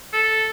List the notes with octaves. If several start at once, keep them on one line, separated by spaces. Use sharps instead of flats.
A4